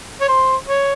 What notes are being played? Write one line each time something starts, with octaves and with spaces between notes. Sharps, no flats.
C#5
C5
C#5